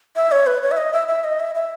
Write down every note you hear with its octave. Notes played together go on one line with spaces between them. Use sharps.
E5
C#5
B4
C#5
E5
D#5
E5
E5
D#5
E5
E5